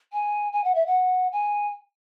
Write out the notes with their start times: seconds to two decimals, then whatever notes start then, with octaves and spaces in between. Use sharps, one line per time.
0.13 G#5
0.53 G#5
0.64 F#5
0.75 E5
0.87 F#5
1.32 G#5